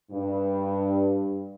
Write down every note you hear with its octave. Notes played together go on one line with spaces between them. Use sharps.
G2